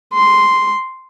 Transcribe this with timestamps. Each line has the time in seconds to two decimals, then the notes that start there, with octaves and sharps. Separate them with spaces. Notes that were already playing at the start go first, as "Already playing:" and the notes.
0.14 C6